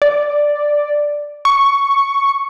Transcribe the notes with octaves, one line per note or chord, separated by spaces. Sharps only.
D5
C#6